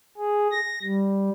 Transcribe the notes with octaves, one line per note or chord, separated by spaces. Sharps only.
G#4
A#6
G3